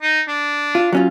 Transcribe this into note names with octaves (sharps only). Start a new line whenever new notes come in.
D#4
D4
F4
F#3 C#4 F4